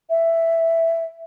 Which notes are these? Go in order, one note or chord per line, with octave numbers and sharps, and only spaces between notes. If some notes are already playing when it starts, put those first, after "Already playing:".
E5